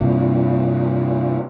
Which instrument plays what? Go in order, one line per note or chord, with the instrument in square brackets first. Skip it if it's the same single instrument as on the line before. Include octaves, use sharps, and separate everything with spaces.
[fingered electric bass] G2 C3 A#3 [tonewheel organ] D4 E4 F4